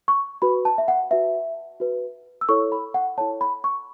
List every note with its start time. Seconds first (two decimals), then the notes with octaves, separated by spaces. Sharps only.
0.08 C#6
0.42 F#4 B4 B5
0.65 A5
0.78 E5
0.88 F#5
1.11 F#4 B4 E5
1.80 F#4 B4
2.41 E6
2.49 E4 A4 C#5 C#6
2.72 B5
2.94 F#5
3.18 E4 A4 C#5 A5
3.41 B5
3.64 C#6